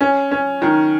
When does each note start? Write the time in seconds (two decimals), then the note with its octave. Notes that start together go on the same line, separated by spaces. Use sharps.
0.01 C#4
0.31 C#4
0.62 D#3